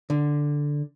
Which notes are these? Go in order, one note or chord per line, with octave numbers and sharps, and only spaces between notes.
D3